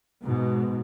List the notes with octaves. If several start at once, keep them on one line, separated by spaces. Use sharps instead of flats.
G#2 B2